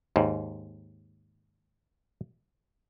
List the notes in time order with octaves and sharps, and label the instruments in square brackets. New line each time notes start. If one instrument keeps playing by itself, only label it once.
[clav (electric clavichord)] D#2 G#2